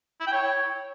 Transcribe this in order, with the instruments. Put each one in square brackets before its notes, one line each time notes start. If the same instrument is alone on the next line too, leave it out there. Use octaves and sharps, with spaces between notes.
[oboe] E4
G5
C#5